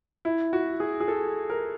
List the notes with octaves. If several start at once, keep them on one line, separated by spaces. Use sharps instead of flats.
E4
F#4
G#4
G#4
A4
A#4